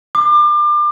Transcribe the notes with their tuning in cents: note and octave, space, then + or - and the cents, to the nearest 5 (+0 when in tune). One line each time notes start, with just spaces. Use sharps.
D6 +30